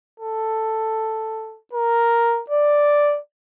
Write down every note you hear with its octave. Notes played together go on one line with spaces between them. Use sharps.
A4
A#4
D5